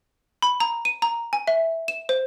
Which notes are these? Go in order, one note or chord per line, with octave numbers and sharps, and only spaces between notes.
B5
A#5
D#7
A#5
G#5
E5
E7
C5